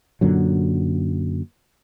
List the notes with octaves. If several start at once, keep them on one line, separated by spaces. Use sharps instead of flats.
F#2 A#2 D3 F#3